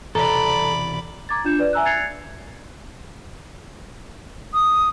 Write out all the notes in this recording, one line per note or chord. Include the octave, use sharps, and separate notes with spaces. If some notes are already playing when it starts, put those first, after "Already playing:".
E1 C2 A4 D5 A#5 B5
A#5 D6 G#6 A6
D4 F4 G6 E7
B4 D5
E5 G#5 A#5 E6 F#6
F#6 G#6 A6 C7 C#7 F7
D#6